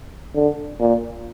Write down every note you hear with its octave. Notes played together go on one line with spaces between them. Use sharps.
D3
A#2